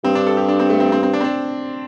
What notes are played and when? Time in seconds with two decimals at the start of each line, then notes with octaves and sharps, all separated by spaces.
0.04 G2 C4
0.15 D4
0.27 A4
0.37 G4
0.49 D4
0.59 C4
0.70 A3
0.80 C4
0.92 C4
1.03 C4
1.13 D4
1.21 C4
1.24 D4